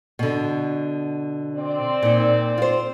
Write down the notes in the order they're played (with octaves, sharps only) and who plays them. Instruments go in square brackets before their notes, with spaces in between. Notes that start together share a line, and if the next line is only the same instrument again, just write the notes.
[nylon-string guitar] B2 D3
[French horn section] C4 D5
[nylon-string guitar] A#2 D#4
F4 C5